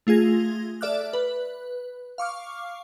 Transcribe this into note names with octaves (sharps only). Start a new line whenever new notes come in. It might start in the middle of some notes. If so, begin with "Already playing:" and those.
A3 F4 G#4 G#6 A#6
A4 D5 E5 D6 F6 F#6
B4
F5 C#6 D6 F6